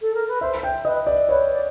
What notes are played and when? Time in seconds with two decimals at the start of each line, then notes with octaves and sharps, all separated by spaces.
0.01 A4
0.14 A#4
0.28 B4
0.41 C5 E5
0.63 G5
0.85 B4 D#5
1.07 D5
1.29 B4 C#5
1.52 D5